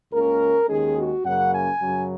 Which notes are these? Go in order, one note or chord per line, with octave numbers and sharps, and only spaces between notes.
C#2 C#3 A#3 C#4 A#4
D#2 D#3 G#3 C#4 G#4
F#4
F#2 C#3 A#3 C#4 F#5
G#5
F#2 C#3 F#3